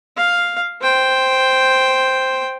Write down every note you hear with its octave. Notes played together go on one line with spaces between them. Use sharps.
F5
C5 G5